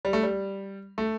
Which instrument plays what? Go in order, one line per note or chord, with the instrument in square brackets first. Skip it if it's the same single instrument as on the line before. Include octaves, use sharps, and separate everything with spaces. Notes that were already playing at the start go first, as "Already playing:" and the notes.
[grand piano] G3
A3
G3
A3